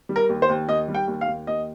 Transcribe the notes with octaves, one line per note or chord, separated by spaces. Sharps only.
G3
A#4
D#2
C5
D#2
D#2 D#5
G3
G5
D#2
F5
D#2
D#2 D#5